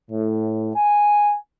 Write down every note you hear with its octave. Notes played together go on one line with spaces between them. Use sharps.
A2
G#5